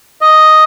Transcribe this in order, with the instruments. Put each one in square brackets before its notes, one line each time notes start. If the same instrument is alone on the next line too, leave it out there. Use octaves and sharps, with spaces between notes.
[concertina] D#5